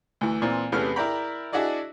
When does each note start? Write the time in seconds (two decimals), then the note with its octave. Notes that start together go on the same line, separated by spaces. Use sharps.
0.21 D2 E3
0.42 A#2 E3 C4
0.72 E2 C3 A3 B3 C#4 F6
0.96 E4 A#4 D5 G5 A#5 B5
1.52 D4 E4 F#4 G#4 D5 D#5